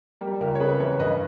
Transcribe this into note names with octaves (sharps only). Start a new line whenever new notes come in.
G3 G4 A#4
C#2 G4 A#4
C#5
C#3 G#4 B4
E3 A#4 C#5
G2 B4 D#5